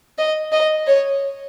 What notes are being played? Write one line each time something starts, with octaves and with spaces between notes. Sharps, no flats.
D#5
D#5
C#5